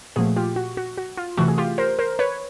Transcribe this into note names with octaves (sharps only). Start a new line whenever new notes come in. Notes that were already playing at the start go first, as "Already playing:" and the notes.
A#2 F3 A3 F#4 G#4
F4 G4
F#4
F#4
F#4
F4
C3 E3 A3 F#4
G#4
F4 G4
A#4 C5
A#4 C5
B4 C#5